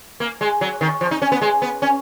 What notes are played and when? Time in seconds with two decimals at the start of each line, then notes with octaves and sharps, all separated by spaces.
0.20 A#3
0.41 G#3
0.61 F#3
0.81 D#3
1.01 F3
1.11 D#4
1.22 C#4
1.32 B3
1.42 G#3
1.62 B3
1.82 C#4